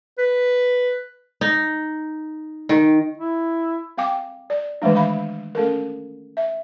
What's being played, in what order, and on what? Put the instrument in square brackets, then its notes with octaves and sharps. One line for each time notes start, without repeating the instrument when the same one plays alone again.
[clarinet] B4
[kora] D#4
D#3
[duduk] E4
[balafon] C4 F5 G5 D6
D5
D#3 E3 G#3 A3 D4
D#3 E5 F5 B5
A3 C#4 A4 A#4
E5